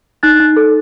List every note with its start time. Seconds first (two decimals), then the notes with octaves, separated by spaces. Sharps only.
0.23 D#4 F#6 A6
0.40 D#4
0.57 A4